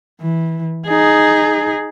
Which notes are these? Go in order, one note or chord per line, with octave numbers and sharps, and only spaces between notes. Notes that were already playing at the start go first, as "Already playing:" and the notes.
E3
D#4 G#4